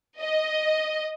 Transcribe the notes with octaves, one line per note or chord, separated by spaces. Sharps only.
D#5